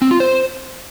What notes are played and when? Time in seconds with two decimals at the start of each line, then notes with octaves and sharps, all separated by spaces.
0.02 C4
0.11 F4
0.20 C5